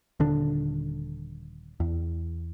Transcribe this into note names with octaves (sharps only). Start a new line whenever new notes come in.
D#1 D3 D4
E2